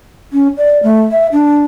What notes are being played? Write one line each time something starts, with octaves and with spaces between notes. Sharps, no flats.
C#4
D5
A3
E5
D4